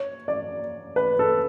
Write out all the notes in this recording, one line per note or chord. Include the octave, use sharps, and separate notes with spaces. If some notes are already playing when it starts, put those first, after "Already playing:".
Already playing: C#5
D5
B4
A4